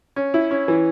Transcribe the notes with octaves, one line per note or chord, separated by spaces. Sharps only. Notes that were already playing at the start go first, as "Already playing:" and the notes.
C#4
E4
C#4
E3